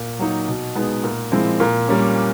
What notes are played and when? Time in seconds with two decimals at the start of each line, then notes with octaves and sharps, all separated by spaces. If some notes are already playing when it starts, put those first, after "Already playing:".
Already playing: A#2
0.19 F#3 A#3 D#4
0.48 B2
0.75 G#3 B3 D#4
1.04 A#2
1.32 F3 G#3 C4 E4
1.60 A#2
1.88 G3 A#3 C#4